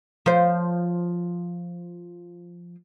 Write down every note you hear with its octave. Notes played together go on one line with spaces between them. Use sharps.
F3 C5